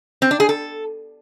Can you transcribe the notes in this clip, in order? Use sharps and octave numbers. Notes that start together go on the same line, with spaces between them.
C4
D4
G#4
A4